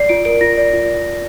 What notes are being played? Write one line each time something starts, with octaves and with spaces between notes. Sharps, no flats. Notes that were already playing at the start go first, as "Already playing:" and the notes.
Already playing: D5 C7
F4 D7
A#4 D7
F4 A#6
D5
F4